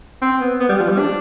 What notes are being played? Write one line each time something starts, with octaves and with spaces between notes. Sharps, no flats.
C4
B3
B3
G3
F3
G3
D4